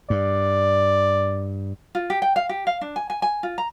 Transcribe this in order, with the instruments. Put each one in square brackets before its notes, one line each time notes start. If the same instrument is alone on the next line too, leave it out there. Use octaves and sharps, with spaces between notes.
[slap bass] G2 [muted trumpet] D5
[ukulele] F4
G4
G5
F5
G4
F5
D4
G#5
G#5
G#5
F4
A#5